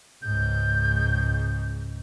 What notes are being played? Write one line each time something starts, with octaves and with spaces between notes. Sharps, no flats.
C#2 G#2 G6